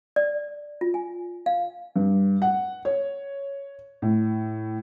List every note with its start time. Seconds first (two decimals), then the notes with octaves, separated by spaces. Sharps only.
0.16 D5
0.81 F4
0.94 G#5
1.46 F5
1.96 G2
2.42 F#5
2.85 C#5
4.02 A2